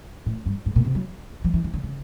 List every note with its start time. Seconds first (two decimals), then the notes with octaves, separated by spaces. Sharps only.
0.26 A2
0.46 G2
0.66 G#2
0.76 A#2
0.85 C3
0.95 F#3
1.44 F3
1.54 E3
1.64 E3
1.74 D3
1.84 C#3